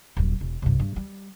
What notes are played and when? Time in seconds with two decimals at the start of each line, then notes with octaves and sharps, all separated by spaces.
0.17 D#1 F#2
0.41 E1
0.62 C2 G2
0.79 G2
0.96 G3